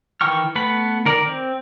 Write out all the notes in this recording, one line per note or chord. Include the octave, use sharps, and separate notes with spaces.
D#3 E3 G5 C#6 F6
A3 B3 B4 B5
D#3 A#4 D5
C4